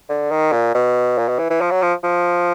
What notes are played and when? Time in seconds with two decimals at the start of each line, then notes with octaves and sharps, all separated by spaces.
0.10 D3
0.31 D#3
0.52 A#2
0.75 B2
1.18 A#2
1.29 B2
1.39 E3
1.50 E3
1.61 F3
1.71 F#3
1.83 F3
2.04 F3